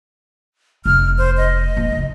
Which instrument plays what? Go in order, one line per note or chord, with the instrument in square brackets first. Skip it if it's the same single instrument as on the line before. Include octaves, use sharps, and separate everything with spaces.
[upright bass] F1 [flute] F6
[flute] C5
D#5
[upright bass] A#3
F#1